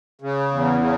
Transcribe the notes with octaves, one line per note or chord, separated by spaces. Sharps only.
C#3
E2
C#3